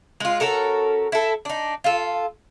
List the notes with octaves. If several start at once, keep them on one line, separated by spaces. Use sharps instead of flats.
G#3 F4
C#4 F#4 A4 A#4
E4 A4
D4 D#4
F4 A4